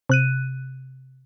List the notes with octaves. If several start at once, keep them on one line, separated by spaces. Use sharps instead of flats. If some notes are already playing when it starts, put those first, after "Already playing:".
C3 F#6 D#7